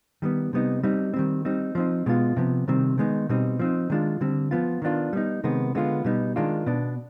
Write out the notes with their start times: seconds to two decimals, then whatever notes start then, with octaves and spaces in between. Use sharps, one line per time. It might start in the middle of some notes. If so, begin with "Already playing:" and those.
0.22 D#3 G3 B3
0.53 C3 G3 B3 D#4
0.83 G3 C4 D#4
1.14 D#3 G3 C4
1.45 G3 C4 D#4
1.75 F3 C4 D#4
2.06 B2 G#3 B3 F4
2.37 C3 F3 B3
2.68 C3 D#3 G3 C4
2.98 D#3 G#3 B3 D#4
3.29 B2 G3 C4 D#4
3.59 F3 C4 D#4
3.90 D#3 G#3 D4 F4
4.21 D3 G3 C4
4.51 F3 B3 F4
4.82 D#3 B3 D4 F4
5.13 G3 B3 D#4
5.44 C3 D#3 G#3 B3
5.75 D3 G#3 B3 F4
6.04 B2 G3 B3 D#4
6.36 D#3 G#3 D4 F4
6.66 B2 B3 D4